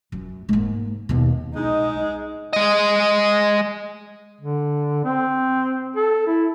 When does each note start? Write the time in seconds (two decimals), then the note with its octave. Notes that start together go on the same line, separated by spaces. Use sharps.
0.12 F#2
0.49 G#2 A#3
1.09 D#2 B2
1.56 G#3 D#4
2.53 G#3 D#5
4.41 D3
5.04 C4
5.96 A4
6.27 E4